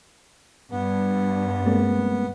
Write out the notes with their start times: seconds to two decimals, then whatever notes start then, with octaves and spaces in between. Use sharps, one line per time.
0.71 G2 B3
1.66 G#3 A#3 C4